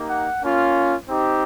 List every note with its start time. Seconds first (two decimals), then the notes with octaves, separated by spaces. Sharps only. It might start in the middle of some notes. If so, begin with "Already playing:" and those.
Already playing: A#3 D#4 G4
0.10 F#5
0.42 A#3 C#4 F4
1.09 C4 D#4 G4